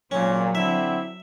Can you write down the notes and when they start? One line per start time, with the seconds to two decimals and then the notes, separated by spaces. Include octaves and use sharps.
0.11 G#1 A#2 F#3 C#4
0.55 D3 C4 E4 E5